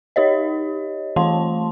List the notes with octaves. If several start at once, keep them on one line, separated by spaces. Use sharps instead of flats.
D#4 G4 C#5 D#5
E3 A3 F4 A5 C6